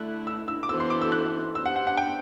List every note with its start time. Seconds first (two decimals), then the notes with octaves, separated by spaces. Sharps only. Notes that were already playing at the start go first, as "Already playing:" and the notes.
Already playing: D3 A3 E4 F#6
0.27 E6
0.48 E6
0.63 D6
0.69 E3 B3 F#4 A4 C5 E6
0.80 C6
0.90 D6
1.01 E6
1.12 F#6
1.55 B3 D4 G4 C5 E6
1.66 F#5
1.76 F#5
1.87 F#5
1.97 G5